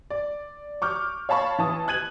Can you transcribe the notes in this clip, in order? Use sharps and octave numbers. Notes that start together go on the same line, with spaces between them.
D5
C#6 D6 F6 G6
C#5 F5 A5 B5 C#6
E3 A5 D#6
F#6 G#6 D#7 F#7